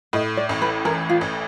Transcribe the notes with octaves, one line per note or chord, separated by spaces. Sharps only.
A2 D#5
D5
A1
B4
E3 A#4
F4
A1